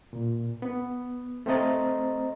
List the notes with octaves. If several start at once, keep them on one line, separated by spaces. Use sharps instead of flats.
A#2
B3
A3 C4 C5 D#5 A#5 A6